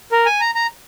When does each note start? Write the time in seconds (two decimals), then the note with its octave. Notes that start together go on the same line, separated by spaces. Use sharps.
0.12 A#4
0.26 G#5
0.40 A#5
0.55 A#5